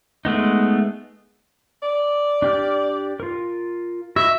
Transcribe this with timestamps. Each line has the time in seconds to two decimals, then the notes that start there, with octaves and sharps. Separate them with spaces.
0.25 G#3 A3 B3 D#4
1.83 D5
2.42 D4 G4 F6
3.20 F4 A#4
4.16 F#4 D#5 E5